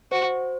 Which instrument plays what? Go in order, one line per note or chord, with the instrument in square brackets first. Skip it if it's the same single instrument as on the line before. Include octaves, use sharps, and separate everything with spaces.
[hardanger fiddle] F#4 [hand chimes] C5